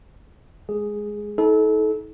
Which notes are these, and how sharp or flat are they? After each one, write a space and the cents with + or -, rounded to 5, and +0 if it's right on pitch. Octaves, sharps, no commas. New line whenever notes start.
G#3 +0 G#4 +0
D#4 +40 A4 -30